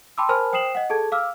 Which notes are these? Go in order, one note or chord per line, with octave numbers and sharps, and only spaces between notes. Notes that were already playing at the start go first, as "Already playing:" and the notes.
G5 A5 B5 C6 D6 E6
A#4 C5 G#5 A5 B5 F6
C5 G5 D#6 C7 E7 F#7
D#5 F#5
G#4 A4 A5 G#6
F5 D6 E6 F6